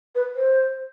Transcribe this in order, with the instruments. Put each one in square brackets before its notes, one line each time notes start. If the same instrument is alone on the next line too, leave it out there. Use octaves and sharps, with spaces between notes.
[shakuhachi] B4
C5